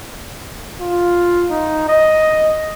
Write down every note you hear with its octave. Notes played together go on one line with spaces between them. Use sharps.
F4
D#4
D#5